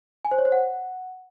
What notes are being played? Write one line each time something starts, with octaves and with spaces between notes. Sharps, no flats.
G#5
C5
C#5
C5
F#5